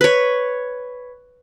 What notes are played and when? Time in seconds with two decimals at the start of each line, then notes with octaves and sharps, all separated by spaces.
0.01 B4 C#5